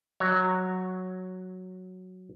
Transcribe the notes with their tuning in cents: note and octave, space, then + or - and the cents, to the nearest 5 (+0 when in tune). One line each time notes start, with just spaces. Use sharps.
F#3 -5 C#5 +0